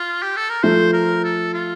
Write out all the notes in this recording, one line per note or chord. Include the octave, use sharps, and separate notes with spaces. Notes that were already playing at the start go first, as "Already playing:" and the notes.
Already playing: F4
G4
A4
A#4
F3 A3 C5
A#4
A4
F4